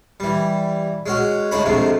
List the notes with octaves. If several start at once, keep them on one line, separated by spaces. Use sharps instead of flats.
E3 G3
G#3 C#4 F#4
C#2 A2 G#3 C#5 A#5 B5
D2 G#2 C3 F3 A3